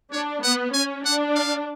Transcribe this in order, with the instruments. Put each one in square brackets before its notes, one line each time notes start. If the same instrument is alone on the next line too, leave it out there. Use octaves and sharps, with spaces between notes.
[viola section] D4 [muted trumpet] C#5
[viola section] B3 [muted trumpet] F#5
[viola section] C#4 [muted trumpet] G#5
[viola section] D4 [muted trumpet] F#5
[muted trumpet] F5